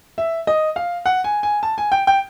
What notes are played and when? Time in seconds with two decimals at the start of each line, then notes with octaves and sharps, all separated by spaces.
0.18 E5
0.47 D#5
0.76 F5
1.06 F#5
1.24 G#5
1.43 G#5
1.63 A5
1.78 G#5
1.92 G5
2.07 G5